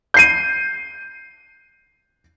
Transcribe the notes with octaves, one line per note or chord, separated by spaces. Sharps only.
G6 C7 D#7